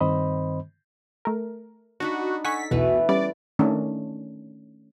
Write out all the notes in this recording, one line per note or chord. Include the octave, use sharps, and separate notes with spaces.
G2 D#3 C4 C5 D#5 B5
A3 A#4
D4 D#4 F#4 B5
A4 F#5 G#5 C#6 B6
B1 E2 B2 E3 A3 B4
G3 B3 C#4 D5
D#3 A3 C#4 D4